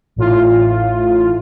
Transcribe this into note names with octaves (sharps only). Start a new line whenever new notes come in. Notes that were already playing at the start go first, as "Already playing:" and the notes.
A1 A2 F4